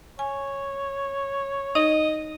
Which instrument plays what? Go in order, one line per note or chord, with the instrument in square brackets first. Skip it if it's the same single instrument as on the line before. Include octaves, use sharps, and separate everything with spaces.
[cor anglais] C#5 [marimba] G#5
[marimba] D#4 [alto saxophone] D#5